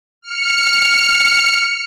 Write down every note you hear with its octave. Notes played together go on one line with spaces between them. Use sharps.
F6 C#7